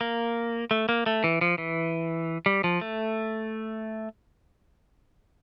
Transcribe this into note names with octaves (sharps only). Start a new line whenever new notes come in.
A#3
A3
A#3
A3
E3
F3
E3
G3
F3
A3